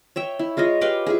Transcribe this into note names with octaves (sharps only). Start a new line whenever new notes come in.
C#5 E5 G5
E4
G#3 F4 C#5 D#5
G4 B4 F5 G5
E4 F4 G#4